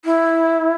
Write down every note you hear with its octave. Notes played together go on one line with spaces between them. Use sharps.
E4